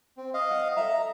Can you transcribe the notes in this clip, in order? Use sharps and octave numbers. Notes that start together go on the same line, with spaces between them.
C4
D#5 F5
F#5
A4 E5 A#5